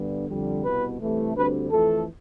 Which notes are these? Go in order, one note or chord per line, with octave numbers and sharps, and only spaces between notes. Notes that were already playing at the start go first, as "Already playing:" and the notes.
Already playing: G2 D3 G3 B3
F2 D3 G3
C2 B2 B3 B4
C2 C3 E3 A3
D2 D3 G3 C4 B4
F2 E3 A3 A4